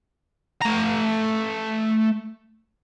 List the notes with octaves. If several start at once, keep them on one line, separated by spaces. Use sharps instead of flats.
A3 A#5